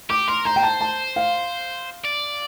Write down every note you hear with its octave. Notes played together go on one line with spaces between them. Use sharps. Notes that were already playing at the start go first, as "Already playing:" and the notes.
G4 D6
A#4 C6
C5 A#5
G5
A5
A5
F5
D5